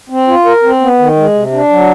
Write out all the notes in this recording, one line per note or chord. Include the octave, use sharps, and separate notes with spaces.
C4
F4
A#4
C4
B3
D#3
G#3
C3
D4
F#3